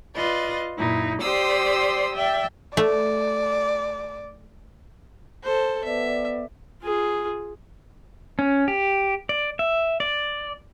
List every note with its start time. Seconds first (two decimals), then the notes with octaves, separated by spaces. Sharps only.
0.15 F4 B4 D5 D#5
0.77 F#2 A#2 D#4 E4
1.21 G4 C5 D5 C6 D#6 E6
2.14 D5 E5 G5
2.77 A3 D5
5.43 A4 C5
5.84 B3 D5 E5
6.83 F4 G#4
8.39 C#4
8.68 G4
9.29 D5
9.59 E5
10.00 D5